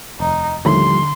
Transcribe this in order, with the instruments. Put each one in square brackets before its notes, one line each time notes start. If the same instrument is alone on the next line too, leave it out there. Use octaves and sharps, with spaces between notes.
[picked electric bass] F1 [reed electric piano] D#2 [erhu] D#4
[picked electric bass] D#2 A2 [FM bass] D3 [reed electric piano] F3 G3 [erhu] C6